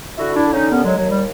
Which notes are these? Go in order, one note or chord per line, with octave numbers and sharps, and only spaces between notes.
D3 E4 F#4
D4 E4
D3
C#4 D#4
D#2 B3 C#4
F#3 G#3
D#2 F#3
G3